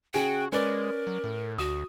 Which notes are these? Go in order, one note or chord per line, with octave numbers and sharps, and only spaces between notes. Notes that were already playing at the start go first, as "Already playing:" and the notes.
C#3 F#4 G#4 G5
G#3 C#4 A#4 B4 D5
F#3
A2
D2 F#4 D#6